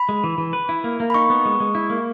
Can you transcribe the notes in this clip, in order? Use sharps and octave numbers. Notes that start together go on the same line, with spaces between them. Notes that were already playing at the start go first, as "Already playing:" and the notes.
Already playing: B5
G#3
E3
E3
B4
E4
A#3
A#3
B5
D#4 C#6
B3
G#3
G#3
E4
A#3